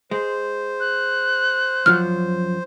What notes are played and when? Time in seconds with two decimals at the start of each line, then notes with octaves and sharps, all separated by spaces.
0.11 G#3 C5
0.80 F#6
1.86 F#2 F3 F#3 F6